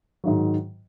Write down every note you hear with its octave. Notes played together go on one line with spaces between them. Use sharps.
G#2 D#3 F#3